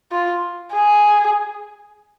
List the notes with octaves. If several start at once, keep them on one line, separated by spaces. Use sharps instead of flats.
F4
G#4